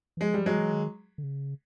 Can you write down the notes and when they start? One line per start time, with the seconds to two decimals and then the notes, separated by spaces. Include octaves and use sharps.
0.17 E3
0.21 F3 G#3
0.34 F3 G3
0.46 F#3 G#3
0.55 E3
0.73 D#3
1.18 D3
1.23 C#3